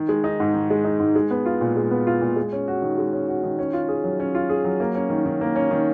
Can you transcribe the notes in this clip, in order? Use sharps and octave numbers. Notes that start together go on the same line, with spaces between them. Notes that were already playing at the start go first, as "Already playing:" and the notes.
Already playing: D#3
G#3
D#4
G#2
D#3
G#3
D#4
G#2
G#3
B3
F4
A#2
G#3
B3
F4
A#2
G#3
C#4
F#4
D#3
G#3
C#4
F#4
D#3
C#4
F4
G#4
F#3
C#4
F4
G#4
F#3
A#3
C#4
D#3
D#3
A#3
C#4
D#3